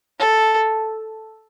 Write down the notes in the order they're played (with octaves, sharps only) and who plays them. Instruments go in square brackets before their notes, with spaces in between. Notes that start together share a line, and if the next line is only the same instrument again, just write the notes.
[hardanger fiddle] A4